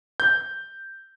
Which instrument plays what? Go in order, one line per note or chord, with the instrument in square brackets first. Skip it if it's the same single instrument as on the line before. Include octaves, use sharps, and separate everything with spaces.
[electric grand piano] G6